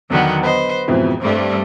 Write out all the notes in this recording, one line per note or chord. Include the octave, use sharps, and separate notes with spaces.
E2 D3 D#3 F#3 B3
B4 C5 D#5
F2 G#2 B2 E3
G2 G3 A3 C4